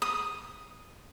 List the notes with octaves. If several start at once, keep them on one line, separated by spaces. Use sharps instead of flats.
D#6